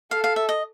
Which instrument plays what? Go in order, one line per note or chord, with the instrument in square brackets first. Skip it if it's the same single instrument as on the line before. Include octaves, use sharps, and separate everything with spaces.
[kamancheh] A4 [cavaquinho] F5
[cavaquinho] F5
E5
D#5